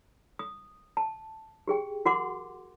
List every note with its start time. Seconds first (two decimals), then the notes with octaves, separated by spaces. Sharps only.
0.39 D#6
0.97 A5
1.67 G4 G#4 G5
2.06 F#4 A#4 F#5 C6 D6